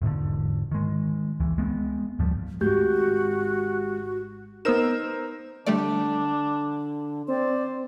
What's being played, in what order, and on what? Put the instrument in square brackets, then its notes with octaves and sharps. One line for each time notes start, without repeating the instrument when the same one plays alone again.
[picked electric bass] E1 G#2 D3
D#3 G#3
C#2 E3
G#3 B3 C4
D2 G#2 F3 G3
[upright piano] G#1 [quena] F#4 [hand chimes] G4 G6
[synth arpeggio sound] B3 E6 E7 [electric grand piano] D#4 A#4 C5
[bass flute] D3 [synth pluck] G3 A3 D5 [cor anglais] D4
[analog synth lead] C4 [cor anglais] C5 [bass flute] D5